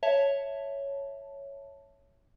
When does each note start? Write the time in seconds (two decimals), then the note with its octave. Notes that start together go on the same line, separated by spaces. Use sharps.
0.03 C#5 E5 A5